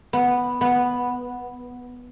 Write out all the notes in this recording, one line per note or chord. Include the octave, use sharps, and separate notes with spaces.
B3
B3